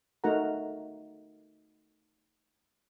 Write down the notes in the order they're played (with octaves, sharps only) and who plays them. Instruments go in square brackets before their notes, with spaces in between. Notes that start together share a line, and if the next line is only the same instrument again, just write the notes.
[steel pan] A3 D#4 F#4 A#4 F#5 A#5